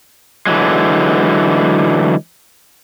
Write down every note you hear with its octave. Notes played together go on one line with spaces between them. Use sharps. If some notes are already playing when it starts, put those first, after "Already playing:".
D3 E3 F#3 G#3